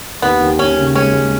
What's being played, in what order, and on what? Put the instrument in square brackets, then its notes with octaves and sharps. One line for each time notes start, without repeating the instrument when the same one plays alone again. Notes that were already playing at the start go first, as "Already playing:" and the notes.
[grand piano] D#2 [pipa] B3
[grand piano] D#2
[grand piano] D#2 [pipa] C#4
[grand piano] C#3
[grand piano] G#3 [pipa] C#4
[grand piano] G#3